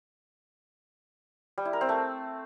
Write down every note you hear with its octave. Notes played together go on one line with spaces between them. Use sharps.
G3
E4
A#4
C4
A3